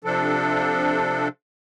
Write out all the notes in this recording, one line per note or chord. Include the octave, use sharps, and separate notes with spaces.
C3 F3 D4 A4